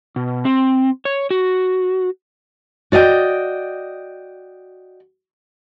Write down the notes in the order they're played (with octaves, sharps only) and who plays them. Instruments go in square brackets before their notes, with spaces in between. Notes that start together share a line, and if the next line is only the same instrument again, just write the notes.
[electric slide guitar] B2
C4
C#5
F#4
[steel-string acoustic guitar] F#4 D5 D#5 F5 G5